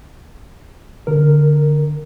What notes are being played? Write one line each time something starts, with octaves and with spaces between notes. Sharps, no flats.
D3 A#4